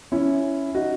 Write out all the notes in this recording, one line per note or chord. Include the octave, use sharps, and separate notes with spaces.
C#4 E4
D#4 F#4